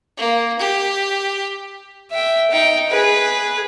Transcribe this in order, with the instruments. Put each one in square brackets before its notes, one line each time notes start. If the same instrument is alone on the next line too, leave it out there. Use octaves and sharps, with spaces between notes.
[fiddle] A#3
G4
E5 G5
D#4 G5
G#4 B4